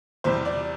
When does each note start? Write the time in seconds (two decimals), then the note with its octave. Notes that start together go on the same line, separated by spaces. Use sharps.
0.24 E2 C3 G3 C5
0.45 D5